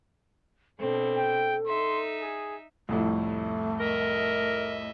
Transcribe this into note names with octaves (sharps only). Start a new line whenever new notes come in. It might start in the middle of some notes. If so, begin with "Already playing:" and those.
B2 C4 D4 A4
G5
D#4 E5 C6
G#4
C2 F2 A2 A3
A#4 D#5 E5